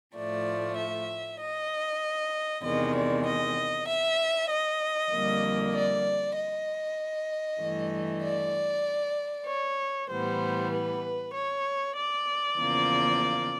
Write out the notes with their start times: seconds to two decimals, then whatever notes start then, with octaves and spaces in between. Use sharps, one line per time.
0.15 A2 F3 A3 D5
0.77 E5
1.40 D#5
2.63 E2 C3 D#3 G#3 D#5
2.94 D5
3.26 D#5
3.87 E5
4.50 D#5
5.12 F2 D3 G3 A#3
5.74 D5
6.37 D#5
7.61 G2 E3 A3
8.23 D5
9.47 C#5
10.10 A2 E3 G3 B3 C5
10.72 B4
11.34 C#5
11.97 D5
12.58 E2 C#3 F3 A#3